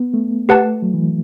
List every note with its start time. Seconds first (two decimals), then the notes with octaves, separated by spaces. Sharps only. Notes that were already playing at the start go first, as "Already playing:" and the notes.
Already playing: B3
0.14 A3
0.49 A3 G4 B4 F#5 A5
0.82 F#3
0.94 E3